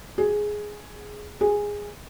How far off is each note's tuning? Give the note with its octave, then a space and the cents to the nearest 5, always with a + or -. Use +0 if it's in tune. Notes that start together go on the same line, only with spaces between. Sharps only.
G#4 +5
G#4 -10